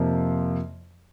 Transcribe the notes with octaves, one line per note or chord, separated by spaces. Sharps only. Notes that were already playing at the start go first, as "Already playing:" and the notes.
Already playing: F2 C3 F3 A#3